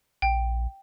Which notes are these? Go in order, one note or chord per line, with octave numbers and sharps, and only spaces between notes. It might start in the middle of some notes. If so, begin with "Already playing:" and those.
A#1 G5